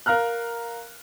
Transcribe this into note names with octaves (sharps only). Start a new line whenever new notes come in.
A#4 F5 A#5 F6 F#6